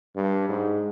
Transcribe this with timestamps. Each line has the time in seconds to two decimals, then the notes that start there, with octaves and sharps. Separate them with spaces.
0.16 G2
0.49 G#2